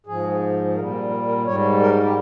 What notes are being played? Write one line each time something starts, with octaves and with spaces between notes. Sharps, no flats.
G#2 F3 G#4
A#2 G3 A#4
A#4
A#4
A#4
G#2 G3 C#5
A#4
G4